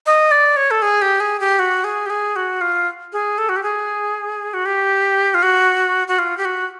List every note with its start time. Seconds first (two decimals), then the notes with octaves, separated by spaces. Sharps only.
0.06 D#5
0.31 D5
0.57 C#5
0.71 A4
0.82 G#4
1.02 G4
1.20 G#4
1.40 G4
1.59 F#4
1.84 G#4
2.06 G4
2.10 G#4
2.36 F#4
2.61 F4
3.13 G#4
3.38 A4
3.49 F#4
3.56 G4
3.63 G#4
4.54 F#4
4.66 G4
5.34 F4
5.43 F#4
6.08 F#4
6.19 F4
6.37 G4
6.45 F#4